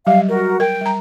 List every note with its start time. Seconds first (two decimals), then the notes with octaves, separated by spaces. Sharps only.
0.07 F#3 G3 G4 F5
0.29 F#4 A#4
0.60 A#4 G5
0.81 G3 A#5